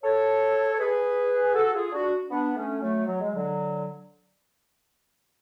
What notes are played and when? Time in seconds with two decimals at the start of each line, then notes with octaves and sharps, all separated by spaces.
0.04 A4 C#5
0.74 C#5
0.79 G#4 B4
1.55 F#4 A4
1.74 F4 G#4
1.92 D4 F#4
2.30 B3 D4
2.56 A3 C#4
2.81 F#3 A3
3.07 F#3
3.21 G#3
3.35 D3 F#3